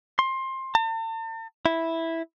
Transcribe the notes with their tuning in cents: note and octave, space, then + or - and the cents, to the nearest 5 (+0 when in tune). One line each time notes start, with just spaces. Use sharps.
C6 +20
A5 +40
E4 -5